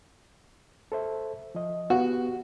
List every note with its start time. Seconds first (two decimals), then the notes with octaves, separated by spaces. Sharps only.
0.92 A4 C5 E5
1.55 F3 D#5
1.90 B3 F#4 G4